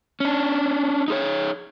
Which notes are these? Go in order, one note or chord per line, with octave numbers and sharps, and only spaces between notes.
C#4 D4
D#4 G#4 C#5